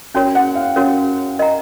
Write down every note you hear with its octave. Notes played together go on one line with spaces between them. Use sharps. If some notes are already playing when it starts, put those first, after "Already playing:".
C#4 F#4 A#4 C#5 G5
F#5
F5
C#4 F#4 A#4 C#5
A#4 D#5 F#5 A#5